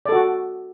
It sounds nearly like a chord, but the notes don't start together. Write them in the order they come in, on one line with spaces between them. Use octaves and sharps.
D5 A4 F#4